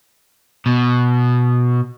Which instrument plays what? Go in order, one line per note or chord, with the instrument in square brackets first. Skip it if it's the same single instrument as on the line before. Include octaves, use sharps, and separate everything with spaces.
[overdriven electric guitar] B2